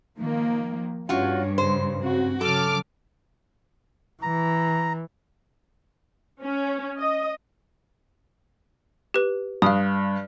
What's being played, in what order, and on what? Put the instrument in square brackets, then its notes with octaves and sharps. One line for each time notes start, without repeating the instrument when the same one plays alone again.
[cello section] D#3 F3 A#3
[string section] G2 [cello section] C#4 C#5 [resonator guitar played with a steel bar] F4 F#4
[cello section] C#3 [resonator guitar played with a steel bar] C5
[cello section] C#3 C4 F#4
[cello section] C#3 F#3 [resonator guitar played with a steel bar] A4 [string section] D6 F6
[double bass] E3 [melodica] A#5
[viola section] C#4
D#5
[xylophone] G4 B4
[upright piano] G2 [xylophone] F5 D#6